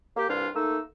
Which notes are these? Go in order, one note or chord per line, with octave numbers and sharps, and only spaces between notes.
A#3 G4
C2 G2 D4 F4
A3 A#3 D#4 E6